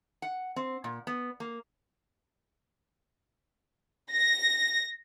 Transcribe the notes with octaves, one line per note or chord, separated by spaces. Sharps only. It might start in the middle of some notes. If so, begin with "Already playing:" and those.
F#5
C4
A#2
B3
A#3
A#6